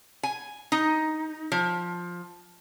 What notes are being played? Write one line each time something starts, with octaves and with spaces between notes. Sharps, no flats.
G#5
D#4
F3